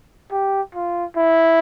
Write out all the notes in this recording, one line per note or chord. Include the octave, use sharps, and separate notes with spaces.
G4
F4
E4